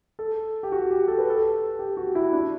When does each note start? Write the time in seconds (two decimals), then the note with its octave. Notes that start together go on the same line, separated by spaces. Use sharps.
0.19 A4
0.63 G4
0.72 F#4
0.91 G4
1.08 A4
1.18 B4
1.30 A4
1.79 G4
1.97 F#4
2.15 E4
2.33 D4